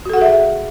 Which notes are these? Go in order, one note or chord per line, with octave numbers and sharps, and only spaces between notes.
F#4 G#4 A4 E5 F#5